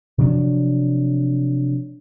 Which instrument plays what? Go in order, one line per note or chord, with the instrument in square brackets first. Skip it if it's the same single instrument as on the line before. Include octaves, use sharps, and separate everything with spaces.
[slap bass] C3 F3 F#3 D4